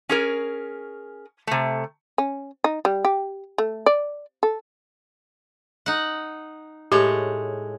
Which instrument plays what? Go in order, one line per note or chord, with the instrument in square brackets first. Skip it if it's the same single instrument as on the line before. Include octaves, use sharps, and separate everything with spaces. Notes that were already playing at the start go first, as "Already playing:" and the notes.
[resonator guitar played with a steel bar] C#4 G#4 A#4
C3 A3
[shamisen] C#4
D#4
G3
G4
A3
D5
A4
[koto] D#4 F#5
[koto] A2 G#3 C#5 [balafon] G4